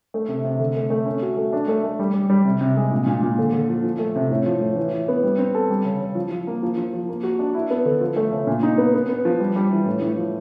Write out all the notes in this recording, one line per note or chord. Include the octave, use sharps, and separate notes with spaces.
A3
C3
C3
D3
A3
A3
C#4
F#4
A3
D4
A3
A3
G3
G3
G3
C3
C3
G#3
A#2
A#2
A#2
D3
D3
F3
F3
A3
C3
A2
F3
A2
E3
E3
B3
G3
C4
A4
G3
C#3
C#3
F3
F3
A#3
F3
F3
F3
A#3
F#4
D4
E4
B3
D3
F3
A3
C#3
A#2
D#4
B3
B3
B3
F3
G3
G3
E3
A2
A2
F3